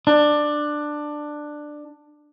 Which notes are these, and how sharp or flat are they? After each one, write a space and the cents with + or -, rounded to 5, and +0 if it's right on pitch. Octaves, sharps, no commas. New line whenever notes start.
D4 +15